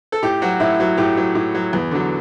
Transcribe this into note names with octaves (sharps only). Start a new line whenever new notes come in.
A4
A2 G4
F#3 F#4
A2 E4
F#3
A2 G4
F#3
A2
F#3
E2
D3 F#3